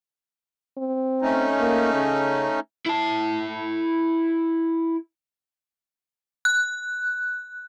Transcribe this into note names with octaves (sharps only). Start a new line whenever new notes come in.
C4
A3 C#4 D#4
A#3
C#3
E4 A5
F#6